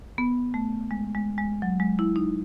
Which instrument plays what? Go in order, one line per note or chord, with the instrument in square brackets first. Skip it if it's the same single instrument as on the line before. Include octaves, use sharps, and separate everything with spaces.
[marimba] B3
A3
G#3
G#3
G#3
F#3
G#3
E4
D#4